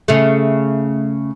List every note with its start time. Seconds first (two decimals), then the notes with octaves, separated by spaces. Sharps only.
0.08 C#3 A3